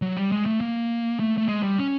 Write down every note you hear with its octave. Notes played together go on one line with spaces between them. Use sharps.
F#3
G3
G#3
A3
A#3
A3
A3
G#3
G3
C#4